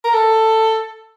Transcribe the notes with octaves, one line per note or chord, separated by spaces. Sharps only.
A#4
A4